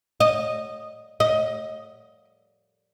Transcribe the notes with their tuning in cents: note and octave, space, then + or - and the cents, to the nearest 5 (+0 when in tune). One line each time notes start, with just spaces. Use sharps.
D#5 +0
D#5 +15